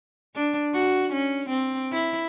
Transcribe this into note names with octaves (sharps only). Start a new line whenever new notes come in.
D4
F#4
C#4
C4
E4